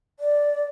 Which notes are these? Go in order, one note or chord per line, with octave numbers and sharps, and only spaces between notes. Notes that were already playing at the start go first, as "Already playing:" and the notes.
D5